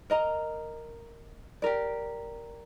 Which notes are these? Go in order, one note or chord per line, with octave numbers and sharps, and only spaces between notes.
A#4 D#5 A#5
G4 A#4 D5